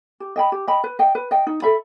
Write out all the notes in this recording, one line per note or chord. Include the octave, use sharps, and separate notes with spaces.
G4
D#5 G5 B5
G4
D#5 G5 B5
B4
D#5 G5
B4
D#5 G5
D#4
A4 E5 B5